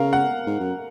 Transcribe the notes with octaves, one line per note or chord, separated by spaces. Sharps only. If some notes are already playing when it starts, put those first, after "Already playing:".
Already playing: C#3 A#4 F5
F#5
G#2
F#2